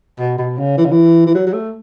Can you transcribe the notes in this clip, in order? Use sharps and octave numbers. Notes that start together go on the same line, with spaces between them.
B2
B2
C#3
E3
C#3
E3
E3
F#3
F#3
A3